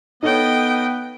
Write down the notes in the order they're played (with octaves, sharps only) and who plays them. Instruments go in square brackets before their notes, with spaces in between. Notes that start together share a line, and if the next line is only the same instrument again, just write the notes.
[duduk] B3 [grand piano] D#4 A4 C#5 [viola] D#5 G5